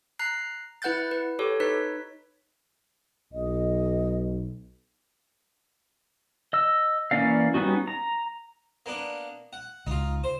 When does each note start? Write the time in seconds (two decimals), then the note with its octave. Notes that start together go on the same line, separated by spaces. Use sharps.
0.19 A#5 F#6 C7
0.82 E4 B4 F#5 F#6 G6 A6
1.11 B4
1.39 G4 A4 C#5
1.60 D#4 B4 C#5 B6
3.33 B1 D#5
6.53 D#5 E6
7.11 E3 A#3 C#4 D5 F5
7.54 G3 B3 C#4 D#4 F#4
7.88 A#5
8.86 A#3 B3 D4
9.53 F#5
9.87 C#2 D#4 F4
10.24 C5